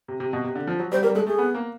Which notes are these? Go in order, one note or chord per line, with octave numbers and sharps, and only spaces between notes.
C3
C3
B2
C3
D3
F3
F#3
G3 C5
G3 A#4
G#3 A4
A3 G#4
B3
A#3